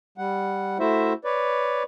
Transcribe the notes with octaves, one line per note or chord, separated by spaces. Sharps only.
G3 F#5
A3 E4 F#4 C5 E5
B4 C#5 D5